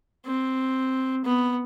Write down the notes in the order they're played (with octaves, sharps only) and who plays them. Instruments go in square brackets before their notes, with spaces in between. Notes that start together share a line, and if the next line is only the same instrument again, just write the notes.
[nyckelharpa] C4
B3